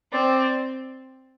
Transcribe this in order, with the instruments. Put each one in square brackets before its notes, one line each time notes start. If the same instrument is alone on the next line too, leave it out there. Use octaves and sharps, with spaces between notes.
[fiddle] C4 [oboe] D5